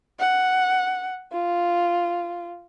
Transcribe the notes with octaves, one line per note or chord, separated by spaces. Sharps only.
F#5
F4